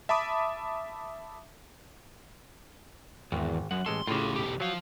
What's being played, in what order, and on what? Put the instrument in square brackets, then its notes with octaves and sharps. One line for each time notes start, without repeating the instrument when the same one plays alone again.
[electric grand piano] E5 A5 B5 D6 D#6
[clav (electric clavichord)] G#1 [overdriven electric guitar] E2
[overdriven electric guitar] F#2 [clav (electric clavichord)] F#5
[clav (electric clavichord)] A1 G#3 A4 [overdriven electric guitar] C6
[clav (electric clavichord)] A2 C#3 [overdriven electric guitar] F4 G4
[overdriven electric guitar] B1 G4
[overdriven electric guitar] F3 F5 [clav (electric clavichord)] F#3